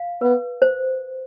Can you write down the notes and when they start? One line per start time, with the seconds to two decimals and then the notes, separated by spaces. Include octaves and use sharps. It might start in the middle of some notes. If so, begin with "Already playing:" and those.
Already playing: F5
0.21 B3 B4
0.62 C5